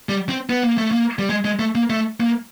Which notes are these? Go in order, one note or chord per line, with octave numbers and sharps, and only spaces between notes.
G3
C4
B3
A#3
A3
A#3
G3
G#3
G#3
A3
A#3
A3
A#3